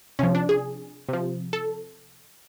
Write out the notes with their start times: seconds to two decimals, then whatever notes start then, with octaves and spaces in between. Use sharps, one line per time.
0.19 C3 F3 C#4
0.35 D4
0.49 G#4
1.09 C3 F3
1.53 A4